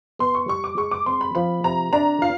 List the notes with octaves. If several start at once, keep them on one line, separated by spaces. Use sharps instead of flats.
B3 C6
C#6
G3 C#6
D6
G#3 C#6
D6
C4 C6
B5
F3 B5
C3 A#5
D4 A#5
F4 F5